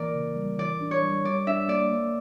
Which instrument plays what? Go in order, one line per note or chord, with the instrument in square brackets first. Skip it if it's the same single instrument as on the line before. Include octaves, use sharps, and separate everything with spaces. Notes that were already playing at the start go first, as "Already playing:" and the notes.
Already playing: [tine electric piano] E3 A#3 [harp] A#4 D5
[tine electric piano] C#3
G3
[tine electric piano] E3 [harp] D5
[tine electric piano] D4
[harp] C#5
[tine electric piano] G3
[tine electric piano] G3 [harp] D5
[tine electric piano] D4 [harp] E5
[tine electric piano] A#3 [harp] D5
[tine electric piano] A#3